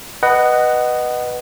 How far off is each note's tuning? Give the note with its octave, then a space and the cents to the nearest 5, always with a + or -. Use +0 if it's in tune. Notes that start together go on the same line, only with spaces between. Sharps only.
B4 +0 D#5 -10 F#5 +15